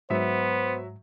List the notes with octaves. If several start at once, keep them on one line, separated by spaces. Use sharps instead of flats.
G#2 F#3 B3 C5 E5